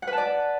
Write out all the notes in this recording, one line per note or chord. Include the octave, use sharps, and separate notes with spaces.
F#5
B4
A5
D5